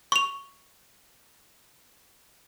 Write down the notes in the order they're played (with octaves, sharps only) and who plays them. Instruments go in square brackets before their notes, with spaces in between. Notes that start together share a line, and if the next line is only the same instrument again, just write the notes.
[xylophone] C#6 F7